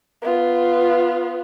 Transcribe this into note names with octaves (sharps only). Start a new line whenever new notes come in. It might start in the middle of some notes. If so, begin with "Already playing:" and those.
B3 F4